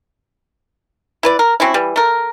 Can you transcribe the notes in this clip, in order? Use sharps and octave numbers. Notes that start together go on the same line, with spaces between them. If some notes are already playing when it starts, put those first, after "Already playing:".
E4 B4 D5
A#4
F#3 C4 C#4 E4
E3 G3
A3 A#4